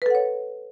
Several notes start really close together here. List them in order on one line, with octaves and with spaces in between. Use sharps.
B4 A4 F#5 C#5